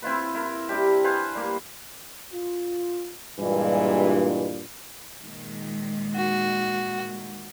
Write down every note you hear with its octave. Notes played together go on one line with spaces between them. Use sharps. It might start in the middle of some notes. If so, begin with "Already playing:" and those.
C4 E4 F4 B4
E4 A#4
C3 G3 D4 G4
B4 C5 F5 G#5
G3 A#3
F4
G2 A#2 E3 G#3
A#2 D#3 G#3
F#4